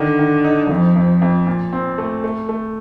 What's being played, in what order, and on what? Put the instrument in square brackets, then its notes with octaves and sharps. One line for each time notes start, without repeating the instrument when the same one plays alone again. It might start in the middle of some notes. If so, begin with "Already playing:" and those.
Already playing: [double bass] D3 [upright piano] D#3
[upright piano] D#3
D#4
[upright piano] F2 [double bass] F3
[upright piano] F2
F2
A#2
C4
A3
A3
A3